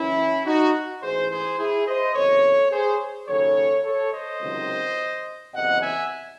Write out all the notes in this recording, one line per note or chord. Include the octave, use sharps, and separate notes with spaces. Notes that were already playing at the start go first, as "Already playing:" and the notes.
Already playing: F#1 F#2 E3 C#4 E4
D#4 F#4
A1 G#2 E3 G#4 C5
G#4 C5
E4 G#4
C5 D#5
F#1 E2 C3 A4 C#5
G#4 C5
D#2 C#3 F#3 A4 C#5
A4 C#5
C5 D#5
C#2 C3 D#3 F#3
F#1 E2 C3 D#5 F#5
E5 G#5